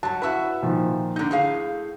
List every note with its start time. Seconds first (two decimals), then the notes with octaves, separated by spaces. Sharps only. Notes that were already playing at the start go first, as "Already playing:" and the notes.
0.03 F#3 G3 A5
0.22 E4 F#4 B4 E5 E6
0.62 A#2 D#3 F3
1.16 D3 D#4 G6
1.31 A2 G#4 F5